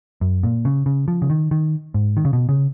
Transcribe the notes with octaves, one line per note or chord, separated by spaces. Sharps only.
F#2
A#2
C#3
C#3
F3
C#3
D#3
D#3
G#2
D#3
C#3
B2
C#3